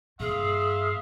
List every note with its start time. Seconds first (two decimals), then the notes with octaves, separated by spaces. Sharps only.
0.20 G2 A#2 G#4 E5 F5 C6